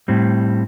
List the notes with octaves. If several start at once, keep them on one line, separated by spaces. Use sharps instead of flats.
A2 G3 C4